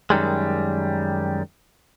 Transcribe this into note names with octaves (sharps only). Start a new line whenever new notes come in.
F#2 D#3 G3 G#3